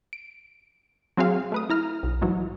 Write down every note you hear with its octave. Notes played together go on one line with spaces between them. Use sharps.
D7
F#3 C4 F#4 G#4 F5
A3 B4 D#6
E4 A#5 F6
B1
G#2 E3 F#3